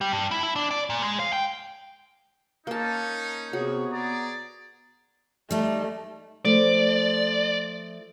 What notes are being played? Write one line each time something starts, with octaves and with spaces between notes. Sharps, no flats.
G3
G2
E4
E4
D4
D5
A#2
G#3
F5
G5
A#3 C#4 D#4 A5
C3 B3 F#4 G#4 C#5
G#4 D5 A#5
G3 A3 D#4
F3 A3 D5